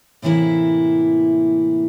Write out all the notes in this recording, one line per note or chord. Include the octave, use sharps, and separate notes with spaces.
A2 C3 E3 A#3 E4